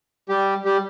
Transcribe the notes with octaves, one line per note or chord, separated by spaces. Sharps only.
G3 G4
G3 G4